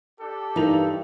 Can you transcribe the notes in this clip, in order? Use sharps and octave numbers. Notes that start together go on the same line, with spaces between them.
D4 G4 A4
G2 E3 D#4 A#4 F7